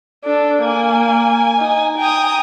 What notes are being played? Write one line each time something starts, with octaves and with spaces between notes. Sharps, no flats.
D4 A4
A#3 G#5
D#4
G5 G#5 A#5 D#6